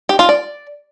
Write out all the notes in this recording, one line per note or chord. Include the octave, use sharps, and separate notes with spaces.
G4
F4
D5